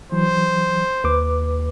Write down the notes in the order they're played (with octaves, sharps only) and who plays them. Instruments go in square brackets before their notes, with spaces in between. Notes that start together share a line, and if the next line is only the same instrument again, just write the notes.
[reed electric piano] E3 F#3 [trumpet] C5
[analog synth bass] D#2 [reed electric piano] B4 D6